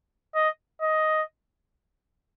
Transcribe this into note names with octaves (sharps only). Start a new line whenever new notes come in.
D#5
D#5